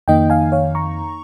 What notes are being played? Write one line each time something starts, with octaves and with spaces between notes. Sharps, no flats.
F2 D#3 A#3 D#4 D#5 G5
F5 G#5
C#5 F5
A#5 C#6